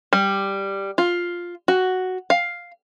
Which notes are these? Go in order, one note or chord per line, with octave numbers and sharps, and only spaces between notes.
G3
F4
F#4
F5